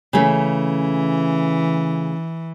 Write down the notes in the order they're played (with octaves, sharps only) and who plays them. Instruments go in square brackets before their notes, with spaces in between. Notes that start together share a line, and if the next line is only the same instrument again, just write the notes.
[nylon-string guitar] C#3 A3 [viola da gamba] E3